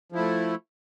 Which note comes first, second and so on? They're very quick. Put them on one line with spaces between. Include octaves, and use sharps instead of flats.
F3 E4 A3